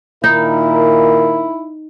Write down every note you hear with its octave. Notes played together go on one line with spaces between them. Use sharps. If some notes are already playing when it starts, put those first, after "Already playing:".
A#2 D#3 D#4 E4 A#4